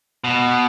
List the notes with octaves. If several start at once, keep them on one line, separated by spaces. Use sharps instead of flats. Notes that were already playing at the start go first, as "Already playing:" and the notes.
B2